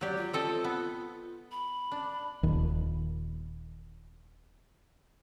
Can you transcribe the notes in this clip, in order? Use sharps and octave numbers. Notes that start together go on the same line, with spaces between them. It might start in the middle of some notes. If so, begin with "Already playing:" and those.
F#3 G4 D5
F4
C4 A4 D#5
B3
B5
D4
D#1 D#2